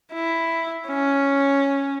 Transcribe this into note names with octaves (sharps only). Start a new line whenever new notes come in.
E4
C#4